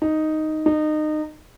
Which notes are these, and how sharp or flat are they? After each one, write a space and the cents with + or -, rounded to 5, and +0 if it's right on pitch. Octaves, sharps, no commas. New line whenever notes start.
D#4 +0
D#4 -25